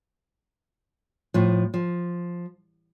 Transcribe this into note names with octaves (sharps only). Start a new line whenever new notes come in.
A2 F3
F3